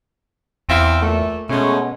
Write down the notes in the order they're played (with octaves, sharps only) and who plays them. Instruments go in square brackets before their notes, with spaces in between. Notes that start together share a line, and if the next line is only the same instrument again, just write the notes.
[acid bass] E2 [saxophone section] C4 E4 F5
[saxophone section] A#2 A3
[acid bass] B2 [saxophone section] G#3 A3 C#4